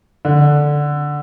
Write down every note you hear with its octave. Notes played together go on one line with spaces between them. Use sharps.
D3